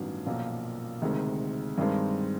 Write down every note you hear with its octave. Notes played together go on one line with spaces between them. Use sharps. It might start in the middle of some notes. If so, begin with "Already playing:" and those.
Already playing: A1 G2 D#3 F#3 B3
B1 A#2 F3
D2 C3 D#3 G#3
G2 D#3 G#3 C4